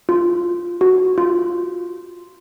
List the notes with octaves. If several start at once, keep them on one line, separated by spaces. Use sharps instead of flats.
F4
F#4
F4